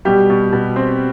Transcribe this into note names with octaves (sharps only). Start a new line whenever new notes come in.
B2 G3 G4
B2
B2
C4